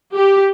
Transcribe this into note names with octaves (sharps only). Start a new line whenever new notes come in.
G4